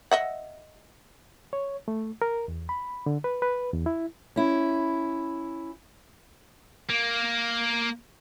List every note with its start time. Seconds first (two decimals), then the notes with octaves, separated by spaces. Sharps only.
0.11 D#5 E5 F#5
1.53 C#5
1.88 A3
2.22 A#4
2.48 E2
2.69 B5
3.06 D3
3.24 B4
3.42 B4
3.73 E2
3.86 E4
4.36 C#4 E4
6.89 A#3